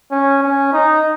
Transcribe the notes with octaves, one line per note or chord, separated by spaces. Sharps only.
C#4
C#4
D#4